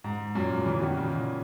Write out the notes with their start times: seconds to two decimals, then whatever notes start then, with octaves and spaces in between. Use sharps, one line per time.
0.04 G#2
0.35 F#2 A#2
0.66 C#3 E3
0.81 B2 D#3
0.97 A#2 C#3